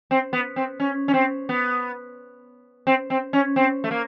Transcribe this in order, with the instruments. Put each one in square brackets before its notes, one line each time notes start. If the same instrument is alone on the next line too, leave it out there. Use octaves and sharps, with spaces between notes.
[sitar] C4
B3
C4
C#4
C#4
C4
B3
C4
C4
C#4
C4
A3
A#3